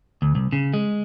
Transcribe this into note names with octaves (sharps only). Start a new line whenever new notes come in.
D2
C2
C#3
G#3